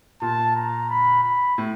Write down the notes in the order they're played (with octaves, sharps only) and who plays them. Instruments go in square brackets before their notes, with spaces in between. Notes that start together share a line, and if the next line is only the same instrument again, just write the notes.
[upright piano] A#2 [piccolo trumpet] A5
[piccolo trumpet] A#5
B5
B5
[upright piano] A2